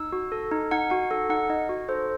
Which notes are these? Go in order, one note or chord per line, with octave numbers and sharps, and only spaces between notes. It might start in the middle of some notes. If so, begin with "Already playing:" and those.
Already playing: D#4 E6
F#4
A4
D#4
D#4 F#5
F#4 F#5
A4
D#4 F#5
D#4 D#5
F#4
A4 C5